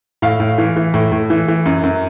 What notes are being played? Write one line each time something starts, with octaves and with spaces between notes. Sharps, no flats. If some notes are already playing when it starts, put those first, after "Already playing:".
A2 F5
A2
E3
E3
A2
A2
E3
E3
F#2
F#2